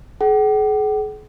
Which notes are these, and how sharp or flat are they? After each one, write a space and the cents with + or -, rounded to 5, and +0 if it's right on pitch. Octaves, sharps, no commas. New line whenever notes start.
G#4 +40 F#5 +45